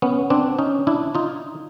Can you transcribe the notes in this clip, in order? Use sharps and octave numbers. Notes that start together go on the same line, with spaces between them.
B3 C#4
C4 D4
C#4 D#4
D4 E4
D#4 F4